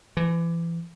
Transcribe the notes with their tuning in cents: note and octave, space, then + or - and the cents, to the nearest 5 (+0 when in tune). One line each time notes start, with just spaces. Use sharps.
E3 +30